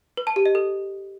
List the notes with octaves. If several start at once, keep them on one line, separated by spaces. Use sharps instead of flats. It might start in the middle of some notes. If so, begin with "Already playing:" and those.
B4
A5
G4
D#5
A4